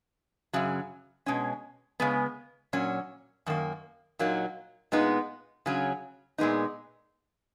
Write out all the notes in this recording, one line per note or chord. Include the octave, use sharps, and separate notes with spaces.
F#2 C#3 F#3
B2 G#3 C#4
C#3 G#3 B3
A#2 F#3 C#4
F#2 D#3 A#3
A#2 F#3 A#3 D#4
A#2 G#3 B3 D#4
C#3 F#3 C#4
A#2 G#3 B3 D#4